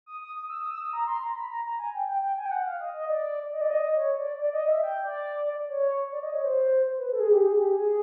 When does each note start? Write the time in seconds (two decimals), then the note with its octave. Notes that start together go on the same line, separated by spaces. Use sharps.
0.06 D#6
0.21 D#6
0.35 D#6
0.50 E6
0.61 D#6
0.71 E6
0.82 D#6
0.93 A#5
1.07 C6
1.21 A#5
1.36 B5
1.50 A#5
1.65 A#5
1.79 G#5
1.94 G5
2.08 G5
2.22 G5
2.37 G#5
2.46 G5
2.51 F#5
2.66 F5
2.80 D#5
2.95 D#5
3.09 D5
3.53 D#5
3.61 D5
3.71 D#5
3.95 C#5
4.18 D5
4.39 D5
4.53 D#5
4.67 E5
4.83 G5
5.04 D5
5.69 C#5
6.12 D5
6.23 D#5
6.34 C#5
6.44 C5
6.98 B4
7.12 A4
7.20 G#4
7.30 G4
7.42 G#4
7.56 G4
7.70 G#4